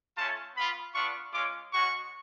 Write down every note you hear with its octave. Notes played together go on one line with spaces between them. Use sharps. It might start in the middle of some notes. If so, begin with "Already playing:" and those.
A3 C#4 F4 A5
B3 F4 B5
B3 D4 F4 C#6
G#3 C#4 F4 D6
G#3 C#4 F#4 C#6